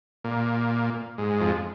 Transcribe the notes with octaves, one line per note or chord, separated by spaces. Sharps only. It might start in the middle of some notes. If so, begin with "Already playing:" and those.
A#2
G#2
F2